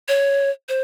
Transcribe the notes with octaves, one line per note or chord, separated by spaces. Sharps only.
C#5
C5